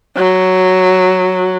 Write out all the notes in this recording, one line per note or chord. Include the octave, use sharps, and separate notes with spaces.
F#3